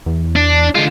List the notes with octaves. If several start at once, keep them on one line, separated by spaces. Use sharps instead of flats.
E2
D4
D3 G#3 F4